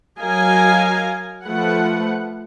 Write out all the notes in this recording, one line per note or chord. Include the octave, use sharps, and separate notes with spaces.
F#3 A#4 D#5 F5 G#5
F3 A3 B4 F#5